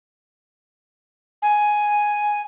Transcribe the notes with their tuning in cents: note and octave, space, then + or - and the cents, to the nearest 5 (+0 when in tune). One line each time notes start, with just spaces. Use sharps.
G#5 +5